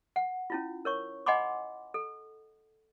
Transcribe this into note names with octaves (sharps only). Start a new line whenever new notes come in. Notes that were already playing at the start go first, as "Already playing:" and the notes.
F#5
C#4 E4 F4
A#4 C#5 C#6
D#5 F#5 G#5 B5 C6 D6
A4